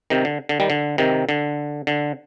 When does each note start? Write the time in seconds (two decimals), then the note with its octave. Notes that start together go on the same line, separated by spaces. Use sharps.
0.10 C3 D#3
0.25 D3
0.49 D3
0.60 D#3 G3
0.70 D3
0.98 C3 D#3
1.29 D3
1.87 D3